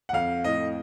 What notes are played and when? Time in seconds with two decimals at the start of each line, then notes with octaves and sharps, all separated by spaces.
0.09 F#5
0.13 F2 F5
0.44 A2 D#5